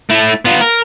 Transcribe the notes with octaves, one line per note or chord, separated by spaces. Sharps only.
A3 E4
B3 F4
A#4